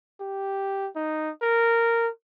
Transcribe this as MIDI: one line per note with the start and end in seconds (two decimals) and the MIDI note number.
0.21 0.89 67
0.96 1.31 63
1.42 2.09 70